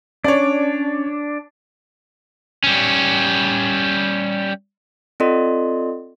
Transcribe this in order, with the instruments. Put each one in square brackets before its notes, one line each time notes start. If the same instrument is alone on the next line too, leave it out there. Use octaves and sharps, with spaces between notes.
[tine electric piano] C#4 [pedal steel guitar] D4 [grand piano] C#5 D5
[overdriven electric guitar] G3 C#4
[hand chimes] C4 F4 A4 D5 D#5 C6